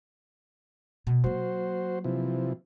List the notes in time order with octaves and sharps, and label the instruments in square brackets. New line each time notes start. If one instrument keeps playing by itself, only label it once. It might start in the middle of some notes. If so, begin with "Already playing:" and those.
[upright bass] B2
[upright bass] F#3 A#3 [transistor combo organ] F#4 C5
[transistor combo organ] C3 E3 F3